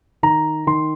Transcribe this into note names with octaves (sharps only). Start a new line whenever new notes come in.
D#3 A#5
D#3 C6